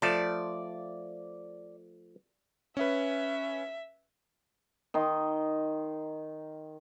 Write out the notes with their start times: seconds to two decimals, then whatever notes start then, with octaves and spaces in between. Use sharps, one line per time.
0.02 F3 A3 D5 A5
2.77 C#4 B4 E5
4.94 D#3 D#5 C6